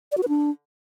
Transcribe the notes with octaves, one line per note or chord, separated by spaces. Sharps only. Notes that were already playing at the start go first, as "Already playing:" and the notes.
D5
F#4
B4
D4